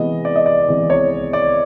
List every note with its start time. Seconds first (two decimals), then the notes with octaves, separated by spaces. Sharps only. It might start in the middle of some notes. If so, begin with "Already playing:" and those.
Already playing: C3 E3 G#3 B3 D#5
0.25 D5
0.36 D#5
0.46 D5
0.68 C3 E3 G#3 B3
0.90 C#5
1.33 D5